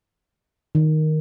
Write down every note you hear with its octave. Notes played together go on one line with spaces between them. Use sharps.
D#3